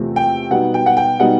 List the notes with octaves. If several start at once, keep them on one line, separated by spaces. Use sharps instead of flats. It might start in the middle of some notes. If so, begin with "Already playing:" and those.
Already playing: E2 C3 F3 A3 C4
G5
B2 G3 B3 D#4 F#5
G5
F#5
G5
B2 G3 B3 D#4 F#5